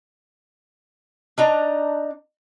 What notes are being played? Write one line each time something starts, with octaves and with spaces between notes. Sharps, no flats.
D4 D#4 A#5